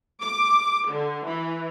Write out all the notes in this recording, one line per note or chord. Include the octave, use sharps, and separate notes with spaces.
D6
D3
E3